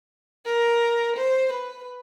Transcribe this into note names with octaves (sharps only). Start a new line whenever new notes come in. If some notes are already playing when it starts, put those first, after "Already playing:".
A#4
C5
B4